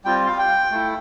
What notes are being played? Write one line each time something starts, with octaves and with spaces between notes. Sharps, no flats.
G3 C4 F4 G5
F5
G5
A3 E4